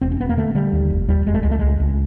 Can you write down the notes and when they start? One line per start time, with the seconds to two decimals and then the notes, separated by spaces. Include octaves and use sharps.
0.01 E1 C4
0.12 C#4
0.20 E1 B3
0.29 A#3
0.37 D3 A3
0.55 D3 G3
0.72 D#2
0.90 F1
1.08 D#2 G3
1.26 F1 G#3
1.34 A3
1.43 C#2 G#3
1.51 A3
1.59 C#2 G#3
1.80 C#2